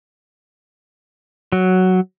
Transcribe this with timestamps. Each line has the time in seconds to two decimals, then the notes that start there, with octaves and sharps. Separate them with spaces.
1.52 F#3